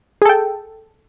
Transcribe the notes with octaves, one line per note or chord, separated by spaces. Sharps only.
G#4 A4 G5